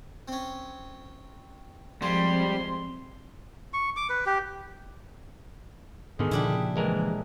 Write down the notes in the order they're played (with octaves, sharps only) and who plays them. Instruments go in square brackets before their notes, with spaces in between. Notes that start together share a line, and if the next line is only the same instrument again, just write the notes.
[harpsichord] C4 C#4
[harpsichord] F2 G#3 [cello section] F3 C4 [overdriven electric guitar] G3 [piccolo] C6
[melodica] C#6
D6
B4
G4
[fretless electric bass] G#2 B3 [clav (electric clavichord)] D3 D#3 [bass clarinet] G#4
[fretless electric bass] A#2 C#3 F3 [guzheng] G3 D4 E4
[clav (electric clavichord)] A#1 G#3 A#4 [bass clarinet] E3